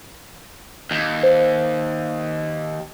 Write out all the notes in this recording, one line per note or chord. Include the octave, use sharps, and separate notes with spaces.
D#2
C5